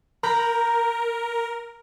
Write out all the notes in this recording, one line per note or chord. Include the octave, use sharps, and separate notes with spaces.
A#4 A#5 B5 G6